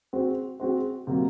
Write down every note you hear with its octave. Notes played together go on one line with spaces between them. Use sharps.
G#3 C4 F#4 C5
G#3 C4 F#4 C5
C3 F#3 A#3